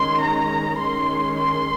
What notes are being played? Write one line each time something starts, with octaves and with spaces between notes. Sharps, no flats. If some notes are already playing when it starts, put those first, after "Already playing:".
Already playing: D#3 G#3 C#4 C6
A#5
D#3 G#3 C#4 C6
C6